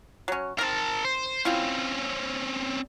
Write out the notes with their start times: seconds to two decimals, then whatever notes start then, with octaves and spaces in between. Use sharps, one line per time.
0.28 F#3 C#4
0.58 D#3 C4 A#4 A5
1.05 C5
1.45 C4 C#4 E4 F4 G5